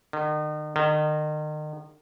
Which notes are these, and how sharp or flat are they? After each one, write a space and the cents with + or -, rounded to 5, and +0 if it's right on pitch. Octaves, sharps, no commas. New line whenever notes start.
D#3 -40
D#3 -35